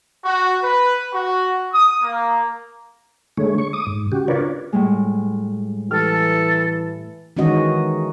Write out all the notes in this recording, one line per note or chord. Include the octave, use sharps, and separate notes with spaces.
F#4
B4
F#4
D#6
A#3
D3 G#3 A3 C#5
C#6
D6 D#6
G#2
C#3 F#4 G4
D4 F4 A#4 B4 C#5 D5
A2 G3 G#3
E3 G4 A4 F6
D#3 E3 G#3 C#4 F#4 D#5